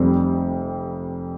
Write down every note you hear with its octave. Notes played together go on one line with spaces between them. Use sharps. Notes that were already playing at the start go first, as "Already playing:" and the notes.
Already playing: F1 F2 C3 G3 C4